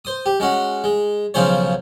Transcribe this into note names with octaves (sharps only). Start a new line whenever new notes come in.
C5 D#6
G4
G#3 C#4 F#4
G#3
B1 C#3 F3 G#4 C5 C#5